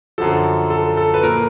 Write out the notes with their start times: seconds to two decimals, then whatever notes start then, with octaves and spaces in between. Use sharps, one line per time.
0.18 F#2 D3 F3 A4
0.70 A4
0.97 A4
1.14 B4
1.23 A#2 F3 A#4